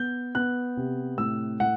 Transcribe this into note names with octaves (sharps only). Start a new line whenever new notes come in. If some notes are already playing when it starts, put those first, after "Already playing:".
Already playing: B3 G6
B3 F#6
C3
A2 E6
A2 F#5